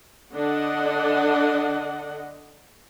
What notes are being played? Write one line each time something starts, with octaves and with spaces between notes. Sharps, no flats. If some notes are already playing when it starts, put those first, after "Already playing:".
D3 D4 D#5 F#5